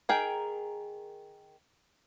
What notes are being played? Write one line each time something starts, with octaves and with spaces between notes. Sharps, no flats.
D#3 G#4 A#4 G5